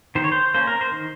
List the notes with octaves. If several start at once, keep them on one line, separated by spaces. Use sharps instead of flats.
D#3 C5
C#5
C5
A#3 C#4 C5
A#4
C5
D#3